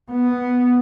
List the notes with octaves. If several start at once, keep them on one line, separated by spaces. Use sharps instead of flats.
B3